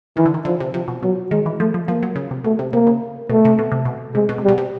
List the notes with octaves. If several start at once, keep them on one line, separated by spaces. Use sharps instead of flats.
D#3 E3
D3
D#3
D3 F3
C3
C3 F3
B2
B2 F#3
D#3 G#3
E3
F3 A3
F3
F3 A#3
F#3
C#3
C3
B2 A3
C3
C3 A#3
C#3
B2 A3
C3
B2
C3
B2
C3 G#3
B2
C3
G3
B2
C3